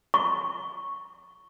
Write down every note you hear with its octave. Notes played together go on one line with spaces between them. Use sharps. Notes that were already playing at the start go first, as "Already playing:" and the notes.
C#6